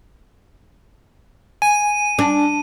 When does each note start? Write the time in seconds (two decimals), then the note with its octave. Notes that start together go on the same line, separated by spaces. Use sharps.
1.62 G#5 D#7
2.19 D4